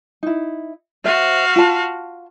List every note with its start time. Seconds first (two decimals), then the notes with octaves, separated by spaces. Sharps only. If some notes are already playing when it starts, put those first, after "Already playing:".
0.23 D#4 E4
1.04 F#4 C5 E5 F5
1.56 F4 A5